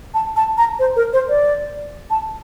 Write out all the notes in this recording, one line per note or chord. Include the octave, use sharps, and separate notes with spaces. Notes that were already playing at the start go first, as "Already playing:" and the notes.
A5
A5
A#5
C5
A#4
C5
D5
A5